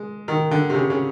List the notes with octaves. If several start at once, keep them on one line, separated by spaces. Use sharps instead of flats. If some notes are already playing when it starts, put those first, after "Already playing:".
Already playing: G#3
D#3
D3
C3
C#3
C#3